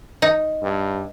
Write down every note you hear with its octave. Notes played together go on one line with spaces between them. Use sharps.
D#4
G2